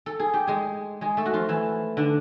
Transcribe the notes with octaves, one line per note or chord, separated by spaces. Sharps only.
A4
G#4
G4
G#3 G#4
G#3 G#4
A3 A4
F#4
F3 F4
E3 E4
D3 D4